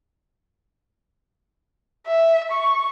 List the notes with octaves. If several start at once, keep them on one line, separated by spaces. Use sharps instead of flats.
E5
C#6